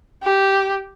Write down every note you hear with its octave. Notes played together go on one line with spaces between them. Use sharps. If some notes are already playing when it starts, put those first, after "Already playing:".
G4